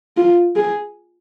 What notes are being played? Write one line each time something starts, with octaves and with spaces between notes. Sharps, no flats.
F4
G#4